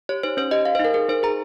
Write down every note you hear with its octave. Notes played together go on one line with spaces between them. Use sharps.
G4 C#5
D#4 C5
C#4 C5
G4 D#5
G4 F5
C5
D#4 A#4
G#4 A#4
D#4 C5
G#4 A#5